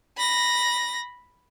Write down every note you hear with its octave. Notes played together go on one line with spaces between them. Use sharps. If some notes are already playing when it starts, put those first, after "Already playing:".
B5 A#6